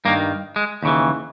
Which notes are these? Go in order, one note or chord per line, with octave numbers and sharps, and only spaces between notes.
G2 D#3 A#3
G#3
D#2 C#3 E3